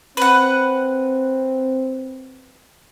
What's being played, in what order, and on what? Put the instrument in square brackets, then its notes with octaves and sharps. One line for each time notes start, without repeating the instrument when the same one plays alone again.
[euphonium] C4 [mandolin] B4 F#5